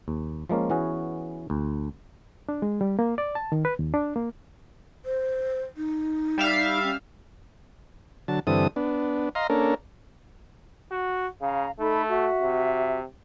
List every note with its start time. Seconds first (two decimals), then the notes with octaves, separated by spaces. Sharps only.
0.08 D#2
0.49 F3 G#3 A#3 C#4
0.70 E3 B3 C#4 F#4 G#4
1.50 D2
2.49 D4
2.62 G#3
2.81 G3
2.99 A#3
3.18 D5
3.35 A5
3.52 D#3
3.65 B4
3.79 D#2
3.94 D4
4.16 A#3
5.05 C5
5.77 D#4
6.38 G3 E5 F5
6.84 C#4
8.28 D3 F#3 A5
8.47 G2 D3 E3 C4 A4 D#6
8.76 B3 D4
9.35 D#5 F5 A#5 C6
9.50 A#3 C#4 D4 A4 A#4
10.91 F#4
11.41 C#3 F5 A#5
11.79 A3 D#4 A4 B5
12.08 F#4 E5
12.42 C3